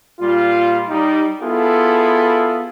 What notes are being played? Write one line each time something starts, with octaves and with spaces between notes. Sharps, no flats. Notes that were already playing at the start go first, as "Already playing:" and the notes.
A#2 G3 F4
G3 D#4
B3 E4 F4 G#4 A4